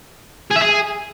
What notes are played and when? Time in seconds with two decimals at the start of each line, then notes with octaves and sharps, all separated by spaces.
0.51 G#4
0.56 E5
0.61 G#4